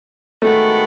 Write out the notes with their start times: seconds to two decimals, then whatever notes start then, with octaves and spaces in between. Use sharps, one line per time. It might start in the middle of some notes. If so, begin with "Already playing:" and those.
0.42 D#3 G#3 A3 B3 F#4 A4